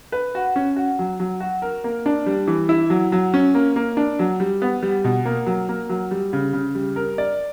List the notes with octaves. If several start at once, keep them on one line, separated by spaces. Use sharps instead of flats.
B4
F#4
C#4
F#4
F#3
F#3
F#4
A#4
A#3
D4
G3
E3
E4
F#3
F#3
C#4
A#3
A#3
D4
F#3
G3
B3
G3
B2
A#3
F#3
A#3
F#3
G3
C#3
C#3
G3
A#4
D5